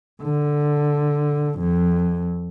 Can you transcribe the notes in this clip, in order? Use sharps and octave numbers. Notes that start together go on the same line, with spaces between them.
D3
F2